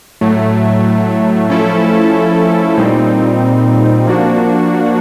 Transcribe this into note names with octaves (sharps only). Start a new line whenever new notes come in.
A2 F#3 A3
F3 A3 C#4 E4 A4
A#2 G3 C4 D#4
F3 A#3 D4 F#4